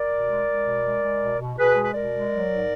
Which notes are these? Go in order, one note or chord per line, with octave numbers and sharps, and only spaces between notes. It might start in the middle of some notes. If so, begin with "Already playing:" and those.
Already playing: A#4 D5
B2
G#3
G#3
B2
G#3
G#3
B2
B2
B2 G#4 B4
G#3
B4
B2 A#4 D5
G#3
F#3
G#2